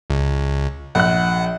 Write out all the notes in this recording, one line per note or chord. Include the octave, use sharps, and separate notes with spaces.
C#2
A#1 F#5 F#6